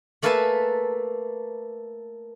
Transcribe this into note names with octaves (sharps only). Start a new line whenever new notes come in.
A3 A#3 A4 B4 G#5 A5